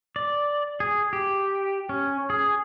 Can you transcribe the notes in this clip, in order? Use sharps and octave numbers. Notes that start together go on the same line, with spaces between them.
D5
G#4
G4
C#4
G#4